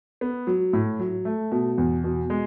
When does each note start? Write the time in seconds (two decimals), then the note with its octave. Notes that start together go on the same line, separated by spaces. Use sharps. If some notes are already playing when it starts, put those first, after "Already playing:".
0.21 B3
0.47 F#3
0.73 A2
0.99 F#3
1.25 A3
1.52 B2
1.78 E2
2.04 B2
2.30 G#3